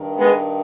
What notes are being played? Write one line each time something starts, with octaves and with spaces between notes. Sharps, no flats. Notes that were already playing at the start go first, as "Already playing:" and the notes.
Already playing: G2 D#3
G#3 B3